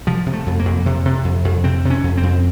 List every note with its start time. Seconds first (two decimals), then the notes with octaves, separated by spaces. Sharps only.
0.07 C3 F3
0.26 C3
0.33 A3
0.46 F2
0.59 A#3
0.65 F2
0.86 C3
1.05 C3
1.24 F2
1.45 F2
1.64 C3 C4
1.85 C3
1.90 C#4
2.04 F2
2.17 C4
2.23 F2